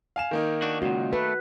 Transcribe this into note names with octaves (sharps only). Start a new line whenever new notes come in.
F5 G#5 E7
D#3 A#3 D#4
D4 F#4
C#2 A#2 F#4
A3 B4